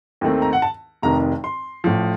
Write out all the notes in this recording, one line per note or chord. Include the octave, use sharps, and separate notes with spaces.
D#2 D#3 A3 C4
A#5
F#5
A5
F1 F2 C3 D#3 A#5
C6
A1 A2 F3